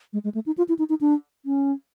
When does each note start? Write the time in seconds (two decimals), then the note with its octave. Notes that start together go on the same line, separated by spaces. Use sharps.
0.13 G#3
0.24 G#3
0.35 A3
0.46 D#4
0.58 F4
0.69 E4
0.79 D#4
0.89 D#4
1.01 D4
1.46 C#4